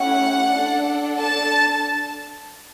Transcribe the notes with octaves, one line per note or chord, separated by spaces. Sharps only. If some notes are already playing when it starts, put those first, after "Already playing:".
Already playing: A3 C#4 E4 G4 F#5
D4 A4
A5